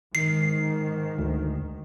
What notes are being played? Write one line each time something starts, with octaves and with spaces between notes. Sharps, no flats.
G#2 D#3 C7
D2